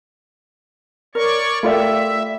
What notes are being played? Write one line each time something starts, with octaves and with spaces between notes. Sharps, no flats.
A#4 C#5 D5 C#6
A3 F4 G4 A#4 D5 E5 B5